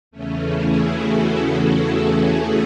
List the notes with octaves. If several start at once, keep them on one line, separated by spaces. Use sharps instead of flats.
E2 C#3 E3 A3 C#4
E4 G#4
F#4 A4
E4 G#4